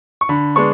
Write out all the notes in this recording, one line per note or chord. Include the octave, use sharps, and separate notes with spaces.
C#6
D3 B5
G#3 B3 D4 C#6